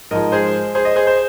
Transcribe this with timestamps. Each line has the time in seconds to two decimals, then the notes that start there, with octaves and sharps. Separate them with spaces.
0.11 G#2 F3 G#3 A#4 D#5
0.32 G#4 C5
0.75 G#4 C5
0.85 D#5
0.96 G#4 C5
1.07 C5